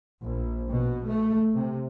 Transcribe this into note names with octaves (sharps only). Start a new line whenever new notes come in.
A#1
B2
A3
C3